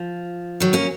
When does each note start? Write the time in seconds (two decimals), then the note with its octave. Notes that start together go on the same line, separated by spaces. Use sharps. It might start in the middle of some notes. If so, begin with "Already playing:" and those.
Already playing: F3
0.60 D#3 F#3
0.73 A#3 C#4